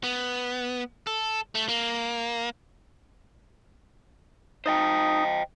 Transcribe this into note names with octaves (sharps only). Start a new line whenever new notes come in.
B3
A4
A3
A#3
D#4 C5 D#5 G5